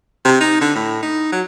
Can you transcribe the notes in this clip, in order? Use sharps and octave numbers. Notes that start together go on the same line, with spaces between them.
C3
D#4
D3
A2
D#4
F#3